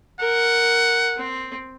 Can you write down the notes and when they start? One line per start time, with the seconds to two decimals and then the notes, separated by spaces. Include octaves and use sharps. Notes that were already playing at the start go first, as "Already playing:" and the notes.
0.20 A#4 F#5
1.17 C4